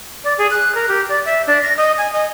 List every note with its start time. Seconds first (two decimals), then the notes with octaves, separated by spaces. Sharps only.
0.24 D5
0.38 G#4
0.51 F#6
0.75 A#4
0.88 G4
1.09 D5
1.25 E5
1.47 D4
1.62 A#6
1.77 D#5
1.98 G#5
2.13 D#5